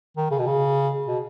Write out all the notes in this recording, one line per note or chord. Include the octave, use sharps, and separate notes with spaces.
D#3
C#3
B2
C#3
B2